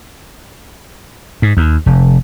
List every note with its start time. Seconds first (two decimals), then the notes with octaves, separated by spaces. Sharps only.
1.42 G#2
1.57 D#2
1.86 F1